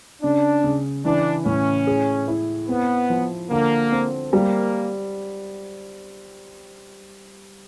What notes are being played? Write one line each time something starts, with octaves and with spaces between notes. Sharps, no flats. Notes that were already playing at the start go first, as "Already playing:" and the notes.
C#3 D4
C#3
E3 D4
A2 C#4
G#4
E4
B3 C4
F3
D3 A#3
C4
G3 A#3